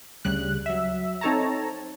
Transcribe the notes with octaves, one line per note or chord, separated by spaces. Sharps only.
D2 C#3 G3 F#6
F#3 E5
C4 D#4 A4 C#5 A5 A#5